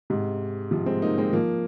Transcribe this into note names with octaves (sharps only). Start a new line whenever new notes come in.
G#2 C3
C3 F3
G#3 C4
A#3 D#4
G#3 C4
F3 A#3